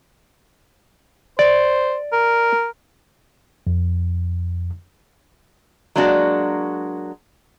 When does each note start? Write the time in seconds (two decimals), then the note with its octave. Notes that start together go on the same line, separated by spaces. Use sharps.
1.39 C5 D5
2.13 A#4
3.67 F2
5.96 F#3 G#3 A#3 D4 F#4